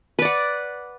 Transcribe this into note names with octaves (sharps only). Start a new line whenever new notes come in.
B4 D5 F#5